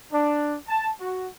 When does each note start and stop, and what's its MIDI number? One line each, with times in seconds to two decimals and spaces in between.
0.13 0.56 62
0.68 0.88 81
1.00 1.27 66